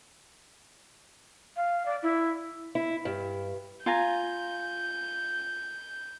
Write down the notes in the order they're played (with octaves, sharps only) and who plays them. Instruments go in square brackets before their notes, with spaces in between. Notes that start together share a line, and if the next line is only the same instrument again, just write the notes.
[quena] F5
D5
E4
[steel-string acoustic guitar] E4
G2
[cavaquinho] F4 G#5 A#5 [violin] G6